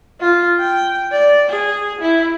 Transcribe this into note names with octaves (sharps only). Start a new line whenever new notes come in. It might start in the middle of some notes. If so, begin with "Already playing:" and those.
F4
G5
D5
G#4
E4